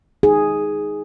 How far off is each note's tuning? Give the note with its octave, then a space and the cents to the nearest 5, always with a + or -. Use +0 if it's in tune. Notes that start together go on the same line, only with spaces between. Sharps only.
D#4 +0 G#4 +0